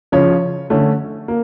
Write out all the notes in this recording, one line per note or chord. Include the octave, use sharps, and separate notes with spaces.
C#3 F3 C#4 C#5
D3 A3 C#4
A#3